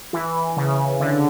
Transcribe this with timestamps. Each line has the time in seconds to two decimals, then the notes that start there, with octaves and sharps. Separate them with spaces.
0.13 E3
0.57 C#3
1.00 D3